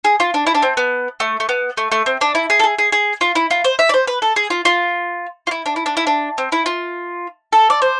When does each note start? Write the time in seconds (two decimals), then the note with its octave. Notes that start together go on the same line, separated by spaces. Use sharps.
0.05 G#4
0.20 F4
0.34 D4
0.47 E4
0.55 D4
0.63 C4
0.77 B3
1.20 A3
1.40 A3
1.49 B3
1.77 A3
1.92 A3
2.06 C4
2.21 D4
2.35 E4
2.50 G#4
2.59 A4
2.64 G#4
2.79 G#4
2.92 G#4
3.21 F4
3.35 E4
3.51 F4
3.64 C5
3.79 E5
3.89 D5
3.94 C5
4.07 B4
4.22 A4
4.36 G#4
4.50 F4
4.65 F4
5.47 F4
5.51 E4
5.66 D4
5.76 E4
5.86 D4
5.97 E4
6.07 D4
6.38 C4
6.52 E4
6.66 F4
7.53 A4
7.70 D5
7.82 C5